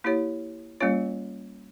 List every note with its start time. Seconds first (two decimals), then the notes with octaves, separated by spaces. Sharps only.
0.04 A#3 E4 G4 C#5
0.80 G3 A#3 C#4 F4 C#5